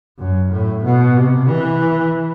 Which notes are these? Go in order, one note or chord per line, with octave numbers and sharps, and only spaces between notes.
F#2
A2
B2
C3
E3